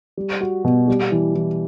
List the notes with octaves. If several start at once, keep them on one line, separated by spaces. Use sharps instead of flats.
G3
F#4
B2
G3
E3
E3